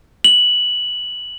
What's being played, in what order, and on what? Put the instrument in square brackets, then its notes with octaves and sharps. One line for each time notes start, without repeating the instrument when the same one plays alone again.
[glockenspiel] F#7